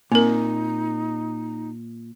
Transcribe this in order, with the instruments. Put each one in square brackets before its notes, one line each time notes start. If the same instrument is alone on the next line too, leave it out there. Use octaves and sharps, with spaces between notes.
[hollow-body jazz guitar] A#2 [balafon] C4 A#4 [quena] D#4